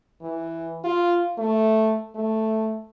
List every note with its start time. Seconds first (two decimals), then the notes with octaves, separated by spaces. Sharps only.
0.21 E3
0.84 F4
1.38 A3
2.15 A3